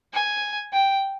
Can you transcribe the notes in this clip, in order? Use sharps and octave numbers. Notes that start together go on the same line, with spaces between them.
G#5
G5